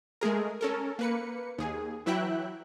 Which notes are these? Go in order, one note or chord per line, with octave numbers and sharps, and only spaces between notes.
G#3 A3 G#4 A#4
C#4 A4 A#4
A#3 B4 C#7
D#2 G#4
E3 F#3 E4 E5 G5 F#6